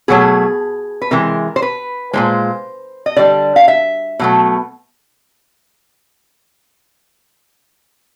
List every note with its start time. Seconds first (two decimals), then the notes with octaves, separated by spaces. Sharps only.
0.08 B2 F#3 A3 G#4
1.02 B4
1.11 C3 E3 G#3 A#4
1.56 C5
1.62 B4
2.13 A#2 F3 G#3 C5
3.06 D#5
3.16 D3 G3 D5
3.56 F5
3.68 E5
4.19 B2 F#3 A3